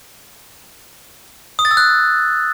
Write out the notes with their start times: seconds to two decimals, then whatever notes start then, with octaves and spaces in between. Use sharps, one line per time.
1.59 D#6
1.65 A6
1.71 E6
1.77 F#6